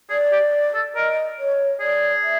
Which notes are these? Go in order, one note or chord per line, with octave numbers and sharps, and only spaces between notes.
G#4 D5
G4
A4
A#4 D#5
C#5
G#4 D5
E5